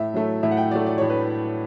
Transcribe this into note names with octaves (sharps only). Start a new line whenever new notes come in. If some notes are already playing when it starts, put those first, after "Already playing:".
Already playing: A2 E5
F#3 A3
A2 E5
F#5
G5
F#3 A3 D5
D5
A2 C#5
B4